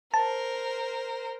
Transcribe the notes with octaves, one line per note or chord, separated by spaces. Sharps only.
A#4 C5 A5